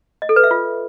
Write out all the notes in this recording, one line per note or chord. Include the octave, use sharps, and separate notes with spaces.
D#5
A4
B4
E5
F4